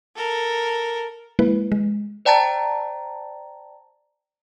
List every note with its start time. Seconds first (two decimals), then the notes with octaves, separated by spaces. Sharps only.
0.16 A4 A#4
1.39 G#3 A#3 E4 B4
1.72 G#3
2.25 C5 D5 G5 A5 A#5 A6